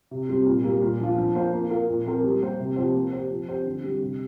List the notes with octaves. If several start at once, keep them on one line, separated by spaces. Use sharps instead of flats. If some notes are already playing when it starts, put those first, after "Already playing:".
C3
G3 C4
A#2
G3 A#3
A#2
F3 D4 F4
F3
A#3 F4 C5
A#3
F4 A#4
A#2
F3 C4 A#4
G3
A#3 G4 C5
C3
F3 C4 G4 C5
A#3
G4 C5
F3
C4 G4 C5
D3
G3 C4
C3